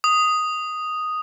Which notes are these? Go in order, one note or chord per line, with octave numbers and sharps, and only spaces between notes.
D#6